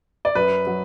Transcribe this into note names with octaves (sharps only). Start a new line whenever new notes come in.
D5
F#2 B4
F#3